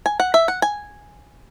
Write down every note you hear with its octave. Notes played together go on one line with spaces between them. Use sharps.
G#5
F#5
E5
F#5
G#5